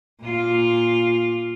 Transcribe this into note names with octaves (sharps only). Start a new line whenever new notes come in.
A#2 F4